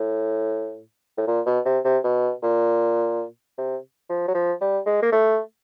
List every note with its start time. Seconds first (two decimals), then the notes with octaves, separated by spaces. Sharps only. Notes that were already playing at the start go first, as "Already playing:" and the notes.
Already playing: A2
1.18 A2
1.27 A#2
1.46 B2
1.65 C3
1.85 C3
2.04 B2
2.43 A#2
3.58 C3
4.09 F3
4.28 F#3
4.35 F3
4.61 G3
4.86 G#3
5.02 A#3
5.12 A3